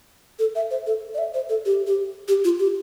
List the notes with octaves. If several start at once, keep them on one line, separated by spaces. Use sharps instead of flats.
A4
E5
C5
A4
D5
E5
C5
A4
G4
G4
G4
F4
G4